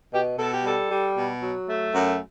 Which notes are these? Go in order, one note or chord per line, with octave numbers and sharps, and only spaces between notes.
B2 G4
B2 A4
G4
G3 A4
G3
B2
F#3
A3
F#2